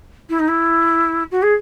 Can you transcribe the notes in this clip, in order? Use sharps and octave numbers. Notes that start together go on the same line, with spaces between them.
E4
D#4
E4
F#4
G#4